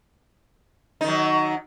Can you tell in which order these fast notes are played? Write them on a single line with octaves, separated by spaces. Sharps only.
D#4 D#3 F#3